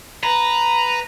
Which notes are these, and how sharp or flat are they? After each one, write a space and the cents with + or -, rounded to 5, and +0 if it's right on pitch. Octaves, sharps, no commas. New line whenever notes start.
B4 +5 A#5 +0